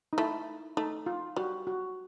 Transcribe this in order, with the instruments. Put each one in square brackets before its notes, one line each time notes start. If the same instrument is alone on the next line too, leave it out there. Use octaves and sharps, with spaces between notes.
[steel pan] D#4
[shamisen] A3 [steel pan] E4
[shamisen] A3 [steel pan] D#4
[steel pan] F4
[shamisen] G3 [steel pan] F#4
[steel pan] F#4